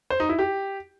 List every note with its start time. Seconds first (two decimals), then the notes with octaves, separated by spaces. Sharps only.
0.10 C5
0.20 D#4
0.29 E4
0.39 G4